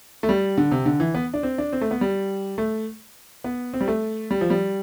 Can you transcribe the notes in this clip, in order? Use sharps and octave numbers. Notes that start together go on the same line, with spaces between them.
A3
G3
D3
C3
D3
E3
B3
D4
C4
D4
C4
A3
B3
G3
A3
B3
C4
G3
A3
G3
F3
G3